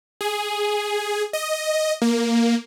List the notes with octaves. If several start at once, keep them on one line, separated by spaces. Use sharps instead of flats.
G#4
D#5
A#3